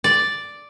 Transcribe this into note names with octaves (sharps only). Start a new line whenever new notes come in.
D5